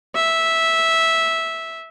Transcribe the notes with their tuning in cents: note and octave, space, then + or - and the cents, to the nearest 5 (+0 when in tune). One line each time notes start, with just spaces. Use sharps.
E5 -10